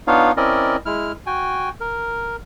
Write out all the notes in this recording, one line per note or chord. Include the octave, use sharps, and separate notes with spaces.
B3 D4 D#4 F4 C#5 F5
C4 C#4 E4 A#4 D5 D#5
G#3 E4 F6
F#4 G5 G#5
A#4